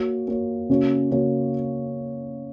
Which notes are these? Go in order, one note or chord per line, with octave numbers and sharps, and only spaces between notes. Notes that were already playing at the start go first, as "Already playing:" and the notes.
Already playing: A#3 F#4 C#5
A#3 F#4 C#5
C#3 A#3 F#4 C#5
C#3 A#3 F#4 C#5